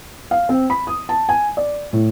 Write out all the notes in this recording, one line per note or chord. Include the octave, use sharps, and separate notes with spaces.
F5
C4
B5
D#6
A5
G#5
D5
A2